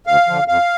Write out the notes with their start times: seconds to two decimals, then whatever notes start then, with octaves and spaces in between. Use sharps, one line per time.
0.06 D2 F5
0.28 D3 F3
0.48 F2 F5